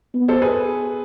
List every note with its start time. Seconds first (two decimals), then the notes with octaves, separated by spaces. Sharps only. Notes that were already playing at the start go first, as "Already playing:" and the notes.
0.14 B3
0.28 A4 C5
0.42 G#4 B4